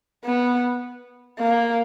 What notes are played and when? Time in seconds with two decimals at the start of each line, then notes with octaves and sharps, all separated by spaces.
0.25 B3
1.39 A#3